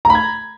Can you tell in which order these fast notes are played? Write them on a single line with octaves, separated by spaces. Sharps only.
A#5 B5 G#6